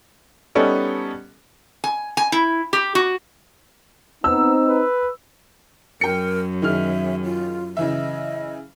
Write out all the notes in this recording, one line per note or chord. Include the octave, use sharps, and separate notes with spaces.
G3 B3 C#4 D#4 A4
G#5
G#5
E4
G4
F#4
B3 C4 D#4 E6
B4
F#2 A#4 G5 C#7
D#3 G#4 E5 F6
F4
C#3 E3 D#5 E5